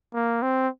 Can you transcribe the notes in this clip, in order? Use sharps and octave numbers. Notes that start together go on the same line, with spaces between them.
A#3
C4